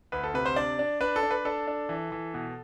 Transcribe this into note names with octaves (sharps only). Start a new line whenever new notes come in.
D2 B4
A4
C3 B4
C5
D4 D5
D4
D4 B4
A4
D4
B4
D4 A4
D4
E3
E3
B2